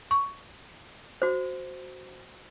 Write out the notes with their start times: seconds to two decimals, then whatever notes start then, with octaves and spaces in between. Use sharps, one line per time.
0.11 C#6
1.22 F#4 C5